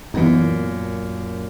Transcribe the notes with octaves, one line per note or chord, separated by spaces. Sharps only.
F#2 A#2 E3 B3 D#4